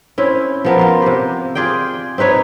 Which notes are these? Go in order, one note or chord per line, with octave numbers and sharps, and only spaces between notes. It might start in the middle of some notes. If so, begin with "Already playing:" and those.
C4 C#4 E4
F3 B3 A#4
F4 F5
C3 G4
F4 G#4 D5 G5
C4 D#4 B4 C#5